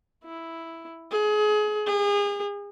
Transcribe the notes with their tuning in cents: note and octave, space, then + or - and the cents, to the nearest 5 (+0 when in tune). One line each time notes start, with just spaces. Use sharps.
E4 +0
G#4 +30
G#4 -35